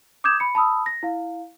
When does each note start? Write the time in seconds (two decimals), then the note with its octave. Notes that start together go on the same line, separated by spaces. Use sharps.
0.24 D6 D#6 G6 G#6 E7
0.40 B5 C#7
0.55 A5 B5 D#6 E6
0.86 A#6
1.03 E4 F5